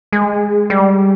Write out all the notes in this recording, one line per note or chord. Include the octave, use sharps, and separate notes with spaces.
G#3
G3